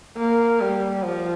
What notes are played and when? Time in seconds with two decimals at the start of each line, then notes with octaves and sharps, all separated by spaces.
0.17 A#3
0.61 G3
1.04 F3